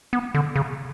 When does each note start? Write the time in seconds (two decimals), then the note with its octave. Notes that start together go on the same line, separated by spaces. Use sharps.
0.13 B3
0.35 D3
0.56 C#3